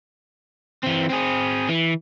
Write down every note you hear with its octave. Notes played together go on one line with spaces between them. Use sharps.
E3 C4
C4 G#4
E3